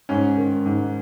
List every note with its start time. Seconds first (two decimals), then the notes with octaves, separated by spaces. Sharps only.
0.09 G#2 C#4
0.37 D#3
0.66 G#2